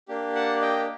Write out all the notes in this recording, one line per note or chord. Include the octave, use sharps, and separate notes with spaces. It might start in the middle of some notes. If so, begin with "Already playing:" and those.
A#3 D4 G4
F#5 A5
D#5 G5